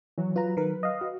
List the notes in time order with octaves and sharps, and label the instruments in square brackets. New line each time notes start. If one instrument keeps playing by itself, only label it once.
[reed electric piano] E3 [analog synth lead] F#3
[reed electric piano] F#3 [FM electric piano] F4 A#5 [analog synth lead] B4
[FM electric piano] D#3 A#4 [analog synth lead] B4
[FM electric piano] D#5 F5
[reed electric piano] F#4